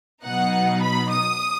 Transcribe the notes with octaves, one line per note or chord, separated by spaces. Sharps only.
B2 F#3 B3 D#4 F#5
B5
D#6